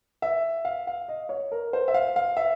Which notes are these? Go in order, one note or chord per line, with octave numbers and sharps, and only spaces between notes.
E5
F5
F5
D#5
C#5
A#4
C5
E5
F5
F5
E5